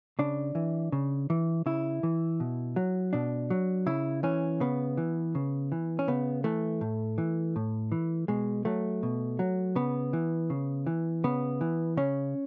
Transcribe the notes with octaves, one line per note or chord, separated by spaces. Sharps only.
C#3 D4
E3
C#3
E3
C#3 E4
E3
B2
F#3
B2 D4
F#3
C#3 E4
E3 C#4
C#3 B3
E3
C#3
E3
C#4
C#3 B3
E3 A3
A2
E3
A2
E3
B2 G#3
F#3 A3
B2
F#3
C#3 B3
E3
C#3
E3
C#3 B3
E3
C#3 C#4